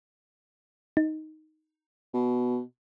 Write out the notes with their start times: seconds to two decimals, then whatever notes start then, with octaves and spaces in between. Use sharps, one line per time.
0.97 D#4
2.14 B2